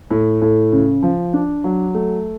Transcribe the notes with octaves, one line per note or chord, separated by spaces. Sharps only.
A2
A2
C#3
F3
D4
F#3
A3